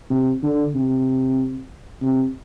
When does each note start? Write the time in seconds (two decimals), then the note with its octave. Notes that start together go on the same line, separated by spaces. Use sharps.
0.10 C3
0.43 D3
0.75 C3
2.02 C3